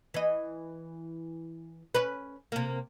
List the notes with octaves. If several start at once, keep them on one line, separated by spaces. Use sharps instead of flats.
E3 D#5
C#4 B4
C3 A#3